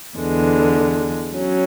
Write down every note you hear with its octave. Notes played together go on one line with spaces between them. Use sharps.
E2 D3 G#3
F#3 C#4